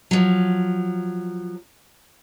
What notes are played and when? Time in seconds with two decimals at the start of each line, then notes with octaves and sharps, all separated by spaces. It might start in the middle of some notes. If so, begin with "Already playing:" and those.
0.11 F3 F#3